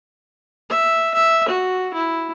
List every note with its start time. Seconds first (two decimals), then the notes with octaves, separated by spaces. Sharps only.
0.70 E5
1.14 E5
1.48 F#4
1.94 E4